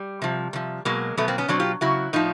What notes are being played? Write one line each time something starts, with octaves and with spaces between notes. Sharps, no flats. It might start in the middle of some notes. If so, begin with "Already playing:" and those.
Already playing: G3
C3 F3
C3 F3
B2 F#3 G#3 A#3
B2 F#3 A3 B3
A#3 C4
B3 C#4
B2 F#3 C4 D4
F4 G4
C#3 F#3 E4 F#4
A2 F3 D#4 F4